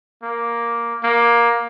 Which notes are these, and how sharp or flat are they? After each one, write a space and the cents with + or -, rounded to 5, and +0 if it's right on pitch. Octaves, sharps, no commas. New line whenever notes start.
A#3 +5
A#3 +15